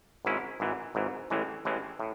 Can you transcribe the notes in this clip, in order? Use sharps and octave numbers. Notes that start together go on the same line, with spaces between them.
G#1 G#2 G#3 C#4 E4
G#1 G#2 E3
G#1 G#2 E3
A1 A2 E3 G#3
A1 A2 E3 G#3
A2